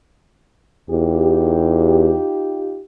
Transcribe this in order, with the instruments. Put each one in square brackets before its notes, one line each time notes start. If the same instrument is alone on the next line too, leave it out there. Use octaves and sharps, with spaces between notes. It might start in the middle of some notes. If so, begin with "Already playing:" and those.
[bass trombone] E2 [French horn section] D#4 F4 G4